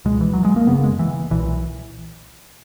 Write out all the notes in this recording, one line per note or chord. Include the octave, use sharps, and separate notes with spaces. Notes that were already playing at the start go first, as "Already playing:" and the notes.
C#2 B2 G#3
E3
F#3
G#3
A#3
F#1 F#2 C#3 B3
G#3
E3
B1 A#2 E3